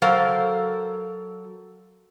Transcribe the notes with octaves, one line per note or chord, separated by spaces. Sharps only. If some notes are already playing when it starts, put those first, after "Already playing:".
F#3 A4 A#4 C5 F5